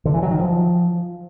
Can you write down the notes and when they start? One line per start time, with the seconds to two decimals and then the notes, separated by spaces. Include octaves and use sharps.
0.05 D3
0.14 E3
0.22 F#3
0.31 D#3
0.39 F3